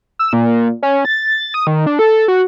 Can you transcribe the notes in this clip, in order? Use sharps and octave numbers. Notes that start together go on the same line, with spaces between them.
E6
A#2
C#4
A6
D#6
D#3
D4
A4
F#4